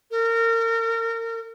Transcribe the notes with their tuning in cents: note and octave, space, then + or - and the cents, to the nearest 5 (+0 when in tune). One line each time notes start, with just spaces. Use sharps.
A#4 -30